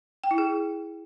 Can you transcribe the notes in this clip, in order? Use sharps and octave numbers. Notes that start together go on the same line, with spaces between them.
G5
E4
G#4